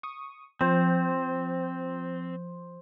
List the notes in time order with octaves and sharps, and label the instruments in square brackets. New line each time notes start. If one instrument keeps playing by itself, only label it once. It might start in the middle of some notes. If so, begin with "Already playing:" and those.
[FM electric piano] C#6 D#6
[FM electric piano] F3 [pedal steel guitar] C4 [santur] C5